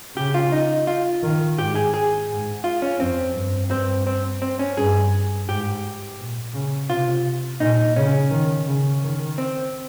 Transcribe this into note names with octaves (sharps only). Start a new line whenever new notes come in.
C#3 G4
F4
D#4
F4
D#3
G#2 G4
G#4
G#4
G#2
F4
C#4
F2 C4
G2
G2 C4
C4
C4
C#4
G2 G#4
G#2 G4
A#2
C#3
C3 F4
A#2 D#4
C#3 C#4
D#3
C#3
D#3
C4